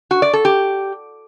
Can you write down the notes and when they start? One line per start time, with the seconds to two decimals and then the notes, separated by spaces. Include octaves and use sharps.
0.11 F#4
0.22 D5
0.33 A4
0.45 G4